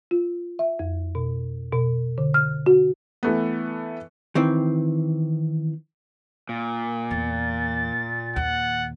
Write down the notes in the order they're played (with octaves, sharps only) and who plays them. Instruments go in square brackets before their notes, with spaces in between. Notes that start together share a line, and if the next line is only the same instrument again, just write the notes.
[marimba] F4
E5
F2
B2
B2
D3
F6
F#4
[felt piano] E3 A3 B3
[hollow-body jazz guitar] D#3 E3 C4
[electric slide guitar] A#2
[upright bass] E2 [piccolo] A6
[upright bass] D#2 A#2 [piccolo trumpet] F#5